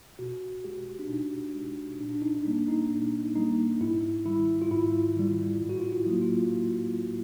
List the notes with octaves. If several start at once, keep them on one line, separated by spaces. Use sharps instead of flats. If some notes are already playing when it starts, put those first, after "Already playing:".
B2 F#4
G#3 G4
D4
B2 D#4
G#3
A#2 D4
D4
D#4
D#4
G3 A#3 D4
D#4
A#2 D4
G3 A#3 D#4
G#2 E4
D#3 G3 E4
F4
G#2 E4
D#3 G3
A2
F#4
F4
E4
F#3 A#3
F4